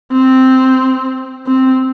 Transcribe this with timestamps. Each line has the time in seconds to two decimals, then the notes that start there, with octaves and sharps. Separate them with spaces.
0.13 C4
1.47 C4